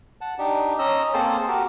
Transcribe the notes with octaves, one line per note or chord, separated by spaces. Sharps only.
F#5 A5
D4 D#4 G4
C#4 D#5 A#5 E6
A#3 C4 G#4 A4 C5
F#4 G4 A#4